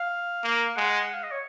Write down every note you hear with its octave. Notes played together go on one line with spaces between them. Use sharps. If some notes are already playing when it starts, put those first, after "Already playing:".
Already playing: F5
A#3
G#3 F#5
F5
D#5
C#5